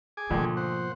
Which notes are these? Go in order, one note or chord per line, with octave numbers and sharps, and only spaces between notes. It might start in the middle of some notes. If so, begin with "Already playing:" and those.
G#4 G#5 D6
D2 G#2 B2 F3 A#3
C5 F#5